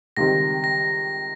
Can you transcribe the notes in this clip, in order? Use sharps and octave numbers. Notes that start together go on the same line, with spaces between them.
C#2 C3 D#3 G3 C4 A#6
A#6